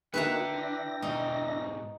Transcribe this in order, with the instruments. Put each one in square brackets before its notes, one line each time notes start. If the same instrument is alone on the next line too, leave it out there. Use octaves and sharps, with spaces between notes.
[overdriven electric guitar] D3 [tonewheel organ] A#3 D#4 F#4 [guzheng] B4 E5 A#5 [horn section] G5
[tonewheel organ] D4 E4 A#6
[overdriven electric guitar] G#2 B2 [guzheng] D#4